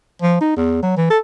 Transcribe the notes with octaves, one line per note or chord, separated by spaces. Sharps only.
F3
D#4
E2
F#3
E3
A4